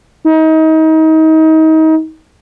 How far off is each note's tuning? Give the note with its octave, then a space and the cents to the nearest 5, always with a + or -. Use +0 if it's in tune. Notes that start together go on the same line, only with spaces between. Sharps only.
D#4 +30